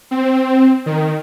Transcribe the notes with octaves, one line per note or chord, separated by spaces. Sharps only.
C4
D#3